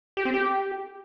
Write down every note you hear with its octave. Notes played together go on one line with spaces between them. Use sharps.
G4
C4
G4